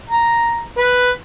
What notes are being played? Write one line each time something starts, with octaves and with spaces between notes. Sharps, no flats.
A#5
B4